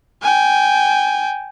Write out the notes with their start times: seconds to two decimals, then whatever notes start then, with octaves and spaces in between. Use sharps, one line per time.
0.22 G5 G#5